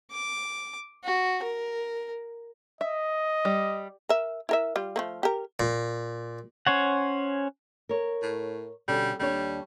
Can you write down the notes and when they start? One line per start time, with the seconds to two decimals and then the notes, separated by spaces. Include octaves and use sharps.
0.12 D6
1.04 F#4
1.43 A#4
2.81 D#5 E5
3.45 G3
4.09 A#4 E5
4.49 E4 A#4 E5
4.76 G3 F4
4.96 F3 A3 A#3
5.23 G4 A#4
5.60 A#2
6.67 C#4 C5 C#5 F#5
7.89 A#4 C#5
8.22 A2
8.88 B2 D3 G3 C#4
9.20 D#2 G3 D4 C#5